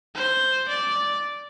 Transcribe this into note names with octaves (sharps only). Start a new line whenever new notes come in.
C5
D5